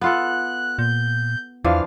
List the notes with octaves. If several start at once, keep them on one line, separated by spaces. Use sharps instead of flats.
B3 F4 A4 F#6
A#2 G6
E2 E3 F3 D4 F5